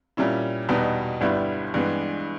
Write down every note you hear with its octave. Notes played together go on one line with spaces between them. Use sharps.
A#2 G3 C#4 E4
E2 B2 G3 B3 D#4
G1 G2 G3 B3 E4
G2 E3 G#3 B3